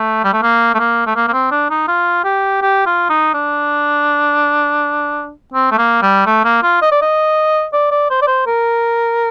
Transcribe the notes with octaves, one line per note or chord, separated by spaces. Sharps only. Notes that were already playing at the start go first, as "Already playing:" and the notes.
Already playing: A3
G3
A3
A#3
A3
A#3
A3
A#3
A#3
C4
D4
D#4
F4
G4
G4
F4
D#4
D4
C4
A3
A#3
G3
A3
A#3
F4
D#5
D5
D#5
D5
D5
C5
D5
C5
A#4